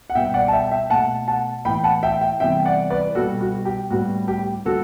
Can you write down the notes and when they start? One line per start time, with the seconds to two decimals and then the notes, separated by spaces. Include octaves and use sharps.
0.10 F#5
0.15 B2 G3 B3 E5 G5
0.34 D5 F#5
0.48 A5
0.53 E5 G5
0.71 E5 G5
0.90 B2 A3 F#5 A5
1.28 F#5 A5
1.65 A2 E3 B3 G5 B5
1.84 F#5 A5
2.03 E5 G5
2.21 E5 G5
2.40 C3 E3 G3 B3 E5 G5
2.65 D5 F#5
2.90 B4 D5
3.15 B2 G3 B3 F#4 A4
3.41 F#4
3.65 G4
3.90 A2 G3 B3 F#4
4.28 G4
4.65 D3 G3 B3 F#4 A4